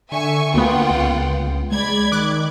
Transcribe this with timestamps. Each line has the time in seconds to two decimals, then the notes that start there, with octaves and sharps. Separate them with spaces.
0.12 D3 E5 G#5 C#6
0.54 D2 A#3 B3 F4 F#5 G5
0.91 C#2
1.72 G#3 D5 B5 G#6
2.12 D#3 D6 F#6